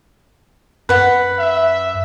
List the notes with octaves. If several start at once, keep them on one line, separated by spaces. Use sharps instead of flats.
F#2 B4 F#5
E5